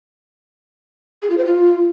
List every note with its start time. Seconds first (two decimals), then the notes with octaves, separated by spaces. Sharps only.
1.22 G#4
1.30 F4
1.38 C5
1.45 F4